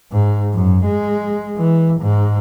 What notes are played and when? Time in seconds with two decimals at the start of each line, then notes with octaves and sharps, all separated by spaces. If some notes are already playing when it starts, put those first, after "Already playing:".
0.12 G#2
0.54 F#2
0.85 G#3
1.57 E3
2.01 G#2